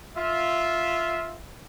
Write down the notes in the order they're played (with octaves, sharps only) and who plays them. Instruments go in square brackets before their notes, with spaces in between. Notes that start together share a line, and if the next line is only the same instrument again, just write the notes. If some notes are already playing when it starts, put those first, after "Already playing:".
[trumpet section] F4 E5